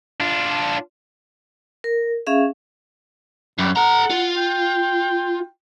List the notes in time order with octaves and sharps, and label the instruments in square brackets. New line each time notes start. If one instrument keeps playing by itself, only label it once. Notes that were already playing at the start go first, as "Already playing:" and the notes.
[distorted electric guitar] D4 F4
[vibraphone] A#4
C#4 G#4 E5 F5
[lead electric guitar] F#2 [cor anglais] G3
[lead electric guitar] A4 A#5 [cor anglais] F#5
[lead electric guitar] F4
[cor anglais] G5